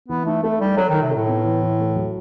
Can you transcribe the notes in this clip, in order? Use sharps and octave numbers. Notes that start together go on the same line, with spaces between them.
E3 B3
A3 D#4
A3 A4
G3 D#4
F#3 A4
D#3 D#4
C3
A2 A4
B3
E3
E3
A3
F#3